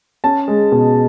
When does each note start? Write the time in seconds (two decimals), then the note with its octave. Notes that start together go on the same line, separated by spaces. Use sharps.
0.24 C#4 A5
0.48 G#3
0.72 B2